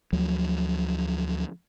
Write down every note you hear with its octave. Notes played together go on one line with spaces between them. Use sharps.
D2 F3 F#3